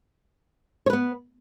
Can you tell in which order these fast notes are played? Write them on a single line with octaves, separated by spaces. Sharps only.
C#5 B4 B3